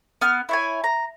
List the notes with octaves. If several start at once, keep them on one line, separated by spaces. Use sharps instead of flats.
B3 F6
E4 C#5 G#5
A#5